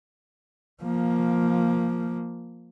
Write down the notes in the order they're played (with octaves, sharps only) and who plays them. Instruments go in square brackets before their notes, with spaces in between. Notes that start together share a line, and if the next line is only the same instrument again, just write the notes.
[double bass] F3 A#3